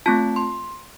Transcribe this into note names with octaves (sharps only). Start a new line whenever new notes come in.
A3 C4 F4 A5
C6